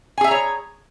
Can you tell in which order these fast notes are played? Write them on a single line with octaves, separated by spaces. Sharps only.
G#5 G#4 E5 A#5 C#5